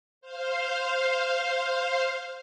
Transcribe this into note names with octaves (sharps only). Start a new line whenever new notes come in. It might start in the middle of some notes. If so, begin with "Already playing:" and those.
C5 F5